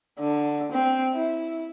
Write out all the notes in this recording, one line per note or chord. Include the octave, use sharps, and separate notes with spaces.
D3
C4
E4